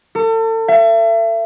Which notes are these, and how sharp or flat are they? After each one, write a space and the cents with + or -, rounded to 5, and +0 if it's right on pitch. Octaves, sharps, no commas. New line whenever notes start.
A4 +35
E5 +35